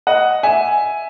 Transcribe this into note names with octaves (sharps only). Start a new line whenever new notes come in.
D#5 F#5
E5 G#5